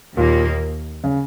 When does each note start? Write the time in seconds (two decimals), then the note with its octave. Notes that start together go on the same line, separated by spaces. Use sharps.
0.17 D#2 A#2 D#3 A#3
1.04 C#3